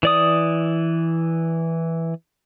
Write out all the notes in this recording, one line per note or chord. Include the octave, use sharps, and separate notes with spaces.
E3 D5 D#6